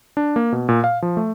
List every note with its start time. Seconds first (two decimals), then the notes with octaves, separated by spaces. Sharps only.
0.17 D4
0.36 A#3
0.52 B2
0.69 A#2
0.84 F5
1.02 F3
1.17 A3